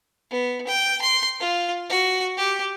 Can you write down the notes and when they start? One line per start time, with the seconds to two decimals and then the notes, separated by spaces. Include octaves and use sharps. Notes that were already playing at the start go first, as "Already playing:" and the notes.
0.30 B3
0.67 G5
1.02 C6
1.40 F4
1.90 F#4
2.37 G4